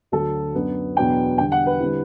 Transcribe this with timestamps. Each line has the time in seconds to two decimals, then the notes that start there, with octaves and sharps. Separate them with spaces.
0.12 D2 D3 F#3 A4
0.54 F#2 F#3 B3 D4
0.96 E2 B2 F#3 B3 D4 G5
1.38 E2 D3 G3 G5
1.52 F#5
1.66 B4
1.80 D3 G3 C4 E4